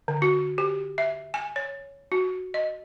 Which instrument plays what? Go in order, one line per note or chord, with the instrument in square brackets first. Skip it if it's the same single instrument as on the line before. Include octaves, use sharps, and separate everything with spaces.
[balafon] D3
F#4
G4
E5
G#5
C#5
F#4
D#5